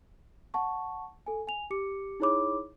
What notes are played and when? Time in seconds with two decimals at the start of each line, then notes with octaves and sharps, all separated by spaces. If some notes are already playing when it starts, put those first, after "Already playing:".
0.54 F#5 A5 C#6
1.26 A4 G#5
1.47 G#5 F7
1.70 G4 D6 C#7
2.20 D#4 E4 G#4 C#5 B5 D6